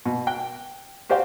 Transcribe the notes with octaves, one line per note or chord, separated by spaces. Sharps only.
B2
G5 F#6
F#4 G4 C5 D5 F5 G5